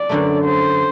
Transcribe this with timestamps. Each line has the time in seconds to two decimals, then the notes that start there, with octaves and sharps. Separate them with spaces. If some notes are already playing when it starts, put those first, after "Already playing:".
Already playing: D5
0.09 F#2 D3 F#3 A3
0.45 C5